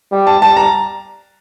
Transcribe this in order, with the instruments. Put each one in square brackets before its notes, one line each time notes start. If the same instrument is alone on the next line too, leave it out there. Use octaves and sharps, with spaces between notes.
[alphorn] G3
[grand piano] A5
[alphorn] G3 [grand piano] A5
[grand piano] A#5